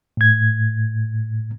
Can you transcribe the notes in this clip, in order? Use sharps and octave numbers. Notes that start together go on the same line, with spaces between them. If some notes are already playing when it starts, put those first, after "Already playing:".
A2 G#6